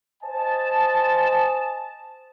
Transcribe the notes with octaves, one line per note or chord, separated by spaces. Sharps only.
C5 D#5 G#5 A5